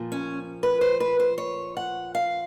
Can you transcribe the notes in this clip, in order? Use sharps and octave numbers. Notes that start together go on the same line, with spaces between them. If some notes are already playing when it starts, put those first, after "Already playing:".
Already playing: A#2 F3
C#4
B4
C5
B4
C5
C#5
F#5
F5